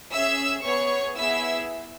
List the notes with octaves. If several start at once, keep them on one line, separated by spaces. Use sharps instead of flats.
C#4 G#4 E5 E6
B3 G#4 C#5 C#6
B3 E4 G#4 E5 E6